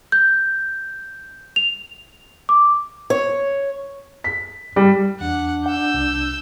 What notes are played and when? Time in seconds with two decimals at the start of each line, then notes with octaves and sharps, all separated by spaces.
0.12 G6
1.56 F7
2.49 D6
3.10 C#5
4.24 B6
4.76 G3
5.21 E2 D4 F#5
5.66 F#5 E6 G6
5.94 C2